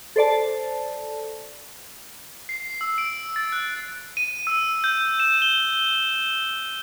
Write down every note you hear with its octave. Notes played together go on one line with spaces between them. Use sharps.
A4 C5 D5 A5
C7
E6
D7
A6
F#6
D#7
E6
G6
E7
G7